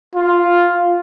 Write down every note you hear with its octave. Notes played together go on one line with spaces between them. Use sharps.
F4